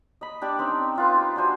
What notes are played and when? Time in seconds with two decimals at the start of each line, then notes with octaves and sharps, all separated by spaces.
0.21 D#5 B5
0.42 D4 G4 D6
0.59 C4 C#4 D#4
0.95 D#4 F4 B4
1.16 G4
1.35 D4 F#4 C5 G#5